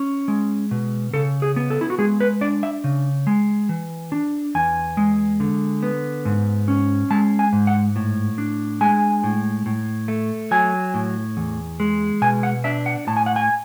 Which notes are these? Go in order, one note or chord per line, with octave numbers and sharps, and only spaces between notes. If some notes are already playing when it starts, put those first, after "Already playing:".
Already playing: C#4
G#3
B2
C#3 A4
G#4
B3
A4
E4
F#4
G#3 G#4
B4
D4 D5
E5
C#3
G#3
E3
D4
E2 G#5
G#3
D3
B3
G#2
C#4
G#3 A5
G#5
G#2
F#5
A2
D4
G#3 G#5
A2
A2
A3
F#3 G#5
A2
E2
G#3
B2 G#5
F#5
D4 E5
F#5
A2 A5
G#5
F#5
G#5